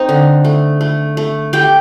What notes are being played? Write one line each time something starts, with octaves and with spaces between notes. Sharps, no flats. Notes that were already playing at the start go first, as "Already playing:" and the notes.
Already playing: A3 C4 D#4 D#5
D3
A3
A3
A3
A3 G4 G5